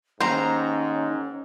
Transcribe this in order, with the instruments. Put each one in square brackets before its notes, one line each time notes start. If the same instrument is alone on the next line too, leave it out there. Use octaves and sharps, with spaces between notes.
[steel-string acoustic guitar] D#2 D#3 A#5 [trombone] G#2 [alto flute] C#4 [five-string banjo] C5